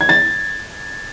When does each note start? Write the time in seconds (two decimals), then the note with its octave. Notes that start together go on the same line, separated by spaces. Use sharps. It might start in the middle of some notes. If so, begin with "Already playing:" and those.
0.01 G#6
0.09 A6